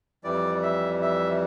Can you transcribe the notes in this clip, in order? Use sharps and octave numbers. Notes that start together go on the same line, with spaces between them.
F2 E3 G3 D5
E5
E5